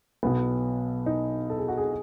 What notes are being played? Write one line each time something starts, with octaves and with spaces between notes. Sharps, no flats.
B1 B2 B3
D#4
A4
G#4
F#4
G#4